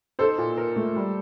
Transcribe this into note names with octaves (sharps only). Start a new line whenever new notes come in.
D#4 A4 C5
A#2
A#4
A3
G3